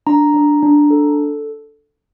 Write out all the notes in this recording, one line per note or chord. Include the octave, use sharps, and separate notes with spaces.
D4 A#5
D4
D4
A4